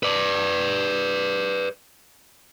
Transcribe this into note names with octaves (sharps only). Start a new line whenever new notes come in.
B4 D5